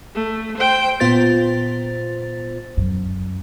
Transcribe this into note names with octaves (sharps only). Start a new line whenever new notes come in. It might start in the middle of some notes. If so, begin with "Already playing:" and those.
A3
C5 G5
A#2 B3 F4 C5 A6
F#2